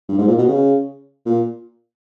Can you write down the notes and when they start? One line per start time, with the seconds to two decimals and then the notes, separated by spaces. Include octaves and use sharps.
0.09 G2
0.19 G#2
0.28 A#2
0.38 B2
0.48 C#3
1.26 A#2